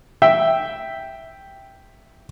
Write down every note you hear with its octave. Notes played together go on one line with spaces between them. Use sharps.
E5 G5